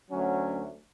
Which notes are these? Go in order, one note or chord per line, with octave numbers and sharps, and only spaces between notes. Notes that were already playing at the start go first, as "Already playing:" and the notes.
D2 F#3 C#4